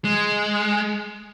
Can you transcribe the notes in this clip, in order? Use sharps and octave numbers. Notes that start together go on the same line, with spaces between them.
G#3